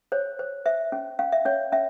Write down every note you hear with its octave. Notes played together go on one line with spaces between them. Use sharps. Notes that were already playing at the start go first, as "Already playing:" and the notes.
C5 C#5
C5
C5 E5
C#4
C#4 F5
E5
C#4 C#5
C#4 E5